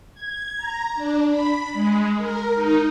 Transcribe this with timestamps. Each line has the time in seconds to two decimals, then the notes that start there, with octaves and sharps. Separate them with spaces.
0.14 G#6
0.57 A#5
0.95 D4
1.28 B5
1.73 G#3
2.17 A#4
2.54 D#4